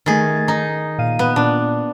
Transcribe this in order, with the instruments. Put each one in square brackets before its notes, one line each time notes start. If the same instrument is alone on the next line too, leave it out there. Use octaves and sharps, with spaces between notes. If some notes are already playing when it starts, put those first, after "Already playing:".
[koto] D#3 G#4 [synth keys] A3 A6
[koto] D#4
[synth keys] A#2 F5 D#7
[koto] B3
[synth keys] A#2 [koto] D4